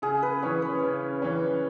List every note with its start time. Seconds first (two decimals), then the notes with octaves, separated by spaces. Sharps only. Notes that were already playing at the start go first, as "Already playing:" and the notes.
0.02 C#3 G#4
0.22 B4
0.42 E3 C#4 C#5
0.62 B4
0.82 C#3
1.22 E3 C#4